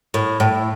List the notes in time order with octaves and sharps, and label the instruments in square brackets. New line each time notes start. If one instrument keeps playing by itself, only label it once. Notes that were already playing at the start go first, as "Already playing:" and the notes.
[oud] A2
A2